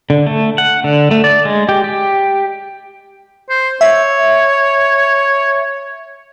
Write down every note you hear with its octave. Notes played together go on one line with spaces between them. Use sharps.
D3
A3
F#5
D3
A3
D5
G#3
G4
G4
C5
C#5 E5